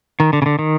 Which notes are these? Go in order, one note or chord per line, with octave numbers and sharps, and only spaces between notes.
D#3
D3
C#3
D3
D#3